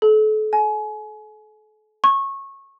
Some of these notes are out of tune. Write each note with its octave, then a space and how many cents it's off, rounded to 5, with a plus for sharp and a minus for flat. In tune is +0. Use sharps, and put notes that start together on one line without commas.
A4 -35
G#5 +30
C#6 -20